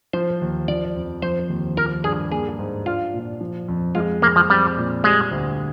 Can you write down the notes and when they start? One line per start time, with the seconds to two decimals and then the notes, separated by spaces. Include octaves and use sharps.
0.13 F3 C5
0.41 D#2
0.68 F3 D5
0.96 F2
1.22 F3 C5
1.49 D#2
1.77 F3 A#4
2.04 G2 G#4
2.32 A#3 G#4
2.59 G#2
2.86 D4 F4
3.13 A#2
3.41 F3
3.68 F2
3.95 G#3 F4
4.22 F2 A#3
4.36 F3
4.50 G3 C4
4.77 A#2
5.04 G3 G#3
5.31 D2